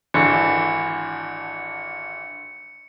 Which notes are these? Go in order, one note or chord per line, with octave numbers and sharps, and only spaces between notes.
G#1 D3 E3 C#7